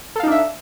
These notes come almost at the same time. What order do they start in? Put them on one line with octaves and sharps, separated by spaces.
A4 F5 D#4 D4 E5